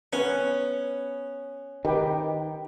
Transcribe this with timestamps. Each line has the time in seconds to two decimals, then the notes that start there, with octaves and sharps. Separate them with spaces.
0.13 B3 C#4 B4
1.85 D#3 G4 B4 G5